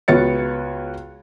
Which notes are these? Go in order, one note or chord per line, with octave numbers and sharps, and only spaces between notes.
C#2 B3 F#4 C#5 A6 C#7